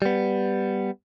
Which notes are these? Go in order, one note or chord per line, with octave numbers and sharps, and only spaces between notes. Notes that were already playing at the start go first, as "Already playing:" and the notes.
G3 B3